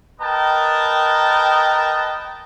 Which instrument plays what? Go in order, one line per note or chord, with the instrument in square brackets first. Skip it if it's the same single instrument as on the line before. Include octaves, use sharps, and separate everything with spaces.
[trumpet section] A#4 B4 D#5 G5 A5